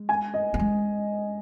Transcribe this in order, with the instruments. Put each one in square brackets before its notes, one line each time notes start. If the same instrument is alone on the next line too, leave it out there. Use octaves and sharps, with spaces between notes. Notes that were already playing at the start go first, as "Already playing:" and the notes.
Already playing: [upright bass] G#3
[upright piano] G#5
D#5
[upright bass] B3
G#3